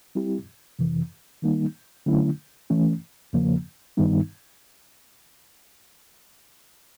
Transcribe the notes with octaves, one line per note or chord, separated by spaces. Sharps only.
G3 C4 E4 G4
F2 C3 E3
D#3 G3 A#3 D#4
D3 F#3 A3 C#4 E4
E3 A3 C#4
E2 C#3 F3 A#3
G2 D#3 G3 B3 D#4